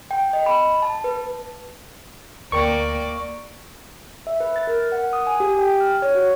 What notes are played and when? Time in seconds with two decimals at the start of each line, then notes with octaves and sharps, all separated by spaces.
0.11 G5
0.33 D#5
0.46 B5
0.82 A5
1.04 B4
2.52 D2 A#3 A#4 D5 G5 C#6
4.27 E5
4.40 B4
4.56 A6
4.67 A#4
4.92 F#5
5.13 D#6
5.27 G#5
5.40 G4
5.59 G5
5.80 F6
6.02 C#5
6.15 F#4